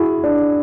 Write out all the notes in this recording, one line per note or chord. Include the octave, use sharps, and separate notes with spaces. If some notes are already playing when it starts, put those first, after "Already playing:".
Already playing: E4 F#4 G#4
D4